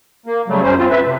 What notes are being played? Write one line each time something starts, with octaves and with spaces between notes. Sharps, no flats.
A#3
C#3 F#3 G3 A3
F#2 C#4 C5
C4 F4
B4 E5
C3